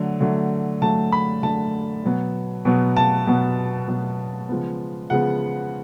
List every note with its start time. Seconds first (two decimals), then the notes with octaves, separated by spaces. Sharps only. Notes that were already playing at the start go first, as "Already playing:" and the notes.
Already playing: D3 F#3 A3
0.20 D3 F#3 A3
0.82 D3 F#3 A3 A5
1.12 B5
1.43 D3 F#3 A3 A5
2.04 B2 F#3 B3
2.65 B2 F#3 B3
2.97 A5
3.27 B2 F#3 B3
3.88 B2 F#3 B3
4.49 C#3 F3 G#3 B3
5.10 C#3 F3 G#3 B3 F#5